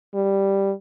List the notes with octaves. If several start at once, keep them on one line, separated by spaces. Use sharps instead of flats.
G3